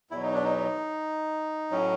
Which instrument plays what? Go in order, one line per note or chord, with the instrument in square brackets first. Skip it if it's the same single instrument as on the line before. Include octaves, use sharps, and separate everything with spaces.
[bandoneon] E2 B2 F#3 E4
D#4
D4
D#4
A2 F#3 C#4